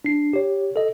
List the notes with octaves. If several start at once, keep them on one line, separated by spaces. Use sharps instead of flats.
D4 C7
G4 C#5
A4 D#5